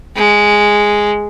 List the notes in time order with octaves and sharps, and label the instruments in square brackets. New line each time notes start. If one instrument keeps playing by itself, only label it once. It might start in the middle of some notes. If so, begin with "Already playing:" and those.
[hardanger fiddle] G#3